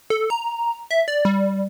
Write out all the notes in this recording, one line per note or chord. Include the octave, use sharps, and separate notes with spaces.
A4
A#5
E5
D5
G3